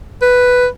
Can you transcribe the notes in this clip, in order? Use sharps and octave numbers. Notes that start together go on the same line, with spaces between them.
B4